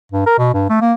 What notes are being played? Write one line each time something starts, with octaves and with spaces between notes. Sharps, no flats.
G2
A#4
B2
G2
A3
A#3